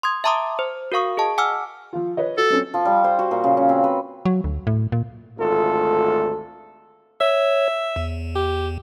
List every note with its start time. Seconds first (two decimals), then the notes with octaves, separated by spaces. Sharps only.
0.03 C6 D#6 G#6
0.24 E5 A5 A#5 C6 D6 D#6
0.59 C5
0.92 F#4 A#4 F5 C#6 D#6
1.17 G#4 D#5 A5
1.38 F#5 G#5 D6 E6 F6
1.93 F3 F4
2.17 B4 C#5 D#5
2.38 F#4 A4
2.50 F#3 C4 C#4
2.74 F3
2.85 G3
3.04 C5
3.19 F#4
3.31 A#2
3.44 C#3
3.57 C#4
3.69 C4
3.84 B4
4.25 F#3
4.44 D2
4.67 A2
4.92 A#2
5.38 G#1 D2 A3 F4 A4
7.21 C#5 E5
7.96 E2
8.35 G4